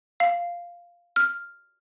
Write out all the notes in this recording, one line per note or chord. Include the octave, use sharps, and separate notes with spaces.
F5
F6